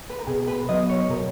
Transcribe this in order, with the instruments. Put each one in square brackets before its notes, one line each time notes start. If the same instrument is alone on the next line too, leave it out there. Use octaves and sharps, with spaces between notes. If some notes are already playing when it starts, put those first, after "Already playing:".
[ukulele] B4
A#4
[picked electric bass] B2 [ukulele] G#4
[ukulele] B4
[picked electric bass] F#3 B3 [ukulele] D#5
[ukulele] C#5
[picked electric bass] B2 [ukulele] A#4